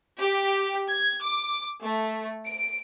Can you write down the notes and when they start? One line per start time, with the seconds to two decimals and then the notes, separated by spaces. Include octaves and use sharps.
0.18 G4
0.89 G#6
1.21 D6
1.82 A3
2.45 D7